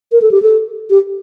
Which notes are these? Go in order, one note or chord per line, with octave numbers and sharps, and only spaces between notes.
A#4
A4
G4
A4
G4